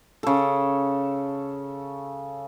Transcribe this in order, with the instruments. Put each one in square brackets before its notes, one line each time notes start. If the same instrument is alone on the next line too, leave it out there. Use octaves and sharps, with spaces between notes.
[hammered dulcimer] C#3 A4